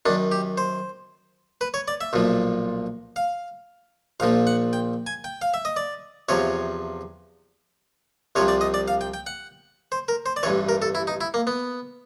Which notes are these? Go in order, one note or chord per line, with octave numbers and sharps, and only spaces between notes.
F#2 D#3 D4
G4
C5
B4
C#5
D5
E5
B1 A#2 F3
F5
A#1 A#2 F3 F5
F#5
G5
G#5
G5
F5
E5
D#5
D5
E2 C3 F3 C#5
C2 C3 F3 C#5
D5
D#5
D5
F5
G5
G5
F#5
C5
A#4
C5
D5
A1 G2 E3 C#5
A#4
A4
E4
D#4
E4
A#3
B3